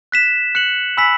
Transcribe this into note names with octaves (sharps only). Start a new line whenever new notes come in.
F#6 B6 E7
F#6 C#7 F#7
G#5 B5 E6 B6 F#7